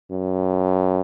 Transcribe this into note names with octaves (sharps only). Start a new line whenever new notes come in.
F#2